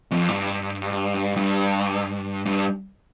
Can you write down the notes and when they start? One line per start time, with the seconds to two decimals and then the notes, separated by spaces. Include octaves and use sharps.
0.11 F2
0.28 G2
1.37 G2
2.45 G2